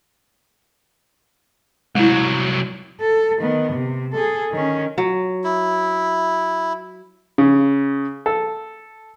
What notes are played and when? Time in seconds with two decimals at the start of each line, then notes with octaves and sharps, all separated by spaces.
1.95 C2 F#3 G#3 E4
3.01 A4
3.39 D#3 B3
3.72 C3
4.13 G#4 A4
4.52 D#3 C#4
4.98 F#3
5.44 E4
7.38 C#3
8.26 A4